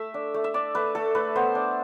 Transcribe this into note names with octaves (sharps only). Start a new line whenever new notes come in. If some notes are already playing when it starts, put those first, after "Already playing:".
Already playing: A3 E5
D4
A3
E5
D4 D5
A3 B4
A3 A4
A3 B4
B3 C5
D4